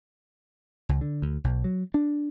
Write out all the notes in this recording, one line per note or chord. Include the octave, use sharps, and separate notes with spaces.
C#2
D3
D2
B1
F#3
D4